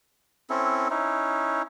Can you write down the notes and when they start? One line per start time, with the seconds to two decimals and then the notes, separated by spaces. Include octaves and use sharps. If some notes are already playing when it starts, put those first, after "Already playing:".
0.50 C4 C#4 E4 A4
0.90 C#4 D#4 E4